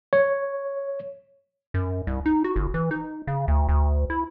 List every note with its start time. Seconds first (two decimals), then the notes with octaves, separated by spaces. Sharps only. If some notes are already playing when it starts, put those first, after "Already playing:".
0.13 C#5
1.74 F#2
2.07 C2
2.26 D#4
2.44 F#4
2.56 G1
2.74 E3
2.91 D#4
3.27 C#3
3.48 D2
3.69 D2
4.10 E4